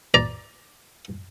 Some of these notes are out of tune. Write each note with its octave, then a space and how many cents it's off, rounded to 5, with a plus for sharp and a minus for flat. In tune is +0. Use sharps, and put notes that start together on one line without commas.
D5 +0 A#5 +15